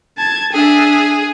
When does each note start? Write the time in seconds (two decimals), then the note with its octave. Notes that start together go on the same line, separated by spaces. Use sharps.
0.18 A5 G#6
0.53 D4 G#4 E5